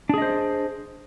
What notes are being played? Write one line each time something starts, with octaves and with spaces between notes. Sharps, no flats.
D4 G#4 C5 D#5